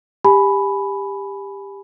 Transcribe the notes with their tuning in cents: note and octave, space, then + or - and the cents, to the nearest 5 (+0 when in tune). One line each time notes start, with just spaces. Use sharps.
G4 +15 G#5 +25 B5 +0